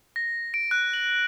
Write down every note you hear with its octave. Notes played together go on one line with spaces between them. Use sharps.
A#6
D7
F#6
F#7